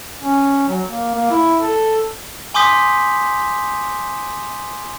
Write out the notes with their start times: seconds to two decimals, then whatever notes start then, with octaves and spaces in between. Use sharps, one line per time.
0.22 C#4
0.69 F#3
0.88 A#3
1.15 A#3
1.31 E4
1.61 A4
2.54 G#5 C6 D6 D#6 G6 B6